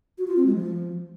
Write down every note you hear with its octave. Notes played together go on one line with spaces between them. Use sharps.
F#4
F4
C4
G#3
F3